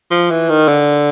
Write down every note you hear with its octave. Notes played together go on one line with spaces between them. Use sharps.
F3
E3
D#3
D3